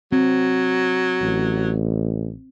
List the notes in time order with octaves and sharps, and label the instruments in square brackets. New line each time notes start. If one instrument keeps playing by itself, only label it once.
[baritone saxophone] F#3 [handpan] C4
[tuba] A1